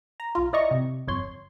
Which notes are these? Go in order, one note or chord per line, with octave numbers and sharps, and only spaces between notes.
A#5
B1 F4
E4 D5 D#5 A#5 C#6
C3
G1 F2 C#5 C6